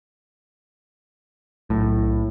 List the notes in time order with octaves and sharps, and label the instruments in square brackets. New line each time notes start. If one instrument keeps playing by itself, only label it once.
[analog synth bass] B1 [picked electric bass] A2